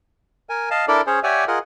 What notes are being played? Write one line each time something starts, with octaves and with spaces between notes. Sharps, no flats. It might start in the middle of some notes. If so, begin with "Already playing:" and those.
A#4 G#5
D#5 F5 A5
D4 E4 A4 A#4 D5
C#4 G#4 C5 C#5
G4 C#5 D5 E5 F#5 G#5
F4 G#4 A#4 D#5 F#5